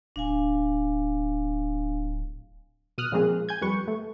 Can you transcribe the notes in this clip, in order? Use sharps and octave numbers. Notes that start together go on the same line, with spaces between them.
D1 D4 F5 G#5
B2 D#6 F6 F#6
A#2 F3 G#3 A#3 C4 G#4
G#5 G6 G#6
F2 G3 B4 C#6
A3